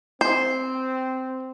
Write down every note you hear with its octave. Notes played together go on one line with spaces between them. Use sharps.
C4 C5